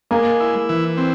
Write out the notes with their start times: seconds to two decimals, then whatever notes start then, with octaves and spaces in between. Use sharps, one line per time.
0.11 G#3 A#3
0.40 E4
0.69 E3
0.98 C4